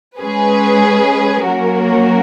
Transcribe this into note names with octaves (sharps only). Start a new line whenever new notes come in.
G#3 C#4 G#4 B4
F#3 A#3 C#4 F#4 A#4